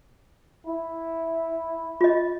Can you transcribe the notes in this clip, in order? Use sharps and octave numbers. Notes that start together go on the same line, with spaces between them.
E4
F4 D#5